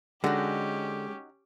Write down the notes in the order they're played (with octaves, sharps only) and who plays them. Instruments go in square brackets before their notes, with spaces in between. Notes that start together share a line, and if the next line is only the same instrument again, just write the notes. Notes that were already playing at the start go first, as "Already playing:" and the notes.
[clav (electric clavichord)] D3 [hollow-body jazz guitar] G#3 [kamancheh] C#4 G4 [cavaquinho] D#4 F#4